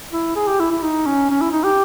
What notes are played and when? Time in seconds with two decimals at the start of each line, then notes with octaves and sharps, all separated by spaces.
0.12 E4
0.35 G#4
0.47 G4
0.60 E4
0.71 E4
0.83 D#4
1.06 C#4
1.30 C#4
1.41 E4
1.52 D#4
1.64 G4